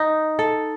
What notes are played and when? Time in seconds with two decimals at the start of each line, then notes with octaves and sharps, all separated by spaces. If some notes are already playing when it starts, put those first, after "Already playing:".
Already playing: D#4
0.39 A4